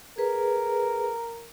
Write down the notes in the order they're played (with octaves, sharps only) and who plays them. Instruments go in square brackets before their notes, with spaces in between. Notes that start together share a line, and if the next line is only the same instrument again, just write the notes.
[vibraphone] G#4 B4 [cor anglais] A#4